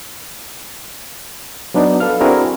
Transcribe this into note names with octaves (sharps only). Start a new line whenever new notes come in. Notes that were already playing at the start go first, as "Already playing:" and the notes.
F#3 B3 D4 D#4
A4 B4 F5 F6
C4 D4 E4 F#4 G#4 A#4